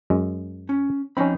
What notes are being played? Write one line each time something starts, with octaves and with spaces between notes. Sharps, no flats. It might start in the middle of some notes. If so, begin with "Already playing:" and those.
F#2 G#3
C#4
F2 C4 C#4 D#4 B5